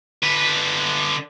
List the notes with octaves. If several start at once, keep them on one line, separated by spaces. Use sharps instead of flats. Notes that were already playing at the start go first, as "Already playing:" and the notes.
D3 B4